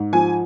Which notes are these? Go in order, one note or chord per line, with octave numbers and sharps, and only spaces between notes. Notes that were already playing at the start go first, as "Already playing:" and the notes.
Already playing: G#2
F3 G#5